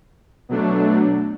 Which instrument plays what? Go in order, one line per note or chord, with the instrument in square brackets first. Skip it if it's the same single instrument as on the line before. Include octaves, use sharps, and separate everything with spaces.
[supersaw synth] B2 F#3 A3 D4